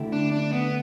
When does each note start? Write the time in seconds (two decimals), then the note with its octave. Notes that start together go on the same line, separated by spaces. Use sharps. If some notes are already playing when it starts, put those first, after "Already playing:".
Already playing: D2 D3 A3 E4 G4
0.12 D4
0.32 D4
0.52 B3